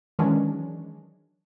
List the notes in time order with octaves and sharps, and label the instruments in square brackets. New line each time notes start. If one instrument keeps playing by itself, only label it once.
[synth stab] D#3 E3 F#3 G#3 C#4 D4